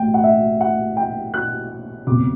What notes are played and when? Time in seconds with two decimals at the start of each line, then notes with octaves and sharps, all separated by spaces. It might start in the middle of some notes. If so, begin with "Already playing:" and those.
Already playing: A1 A2 G5
0.14 F#5
0.24 E5
0.61 F#5
0.97 G5
1.34 F#6
2.07 F#1 E2 C3 D6